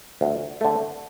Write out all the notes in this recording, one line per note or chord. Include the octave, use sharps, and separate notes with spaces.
D2
D3 A3